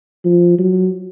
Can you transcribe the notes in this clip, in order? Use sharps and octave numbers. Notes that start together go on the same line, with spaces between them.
F3
F#3